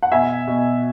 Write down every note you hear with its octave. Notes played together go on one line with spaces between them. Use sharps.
F#5
B2 E5 G#5
B2